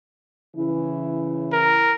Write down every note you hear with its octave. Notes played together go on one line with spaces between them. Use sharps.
C#3 E3 E4
A#4